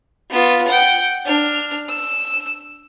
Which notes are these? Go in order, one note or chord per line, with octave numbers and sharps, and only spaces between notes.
B3 F4
F#5 G5
D4 F6
E6